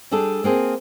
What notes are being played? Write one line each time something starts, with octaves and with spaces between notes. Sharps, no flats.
G3 D4 G#4 A4
A#3 C4 G#4